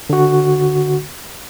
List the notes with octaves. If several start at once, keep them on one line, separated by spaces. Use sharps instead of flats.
D3 F#4